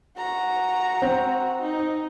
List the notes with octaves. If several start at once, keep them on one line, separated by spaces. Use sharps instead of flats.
F#4 A#5
C4
D#4